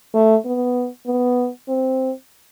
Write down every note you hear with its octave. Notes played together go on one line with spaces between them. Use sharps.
A3
B3
B3
C4